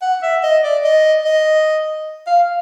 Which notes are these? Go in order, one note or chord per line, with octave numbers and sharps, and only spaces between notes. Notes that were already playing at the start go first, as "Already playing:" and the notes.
F#5
E5
D#5
D5
D#5
D#5
F5